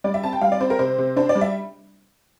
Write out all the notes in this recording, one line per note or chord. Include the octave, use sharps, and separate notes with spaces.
G3 D5
E5
C4 A5
G5
G3 F5
D5
C4 C5
A#4
C3 C5
C3
D4 C5
D5
G3
E5